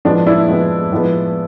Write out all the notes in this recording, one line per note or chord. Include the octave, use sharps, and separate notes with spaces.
A2 F3 G#3 B3 D4
D4 E4
A2 F3 G#3 B3
A2 F3 G#3 B3